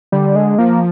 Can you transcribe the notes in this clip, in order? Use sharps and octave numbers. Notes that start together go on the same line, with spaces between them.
D3 G3
G#3
F3 A#3